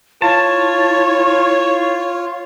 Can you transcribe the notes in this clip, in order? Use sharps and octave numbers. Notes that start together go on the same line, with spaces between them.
E4 F4 C#5 A5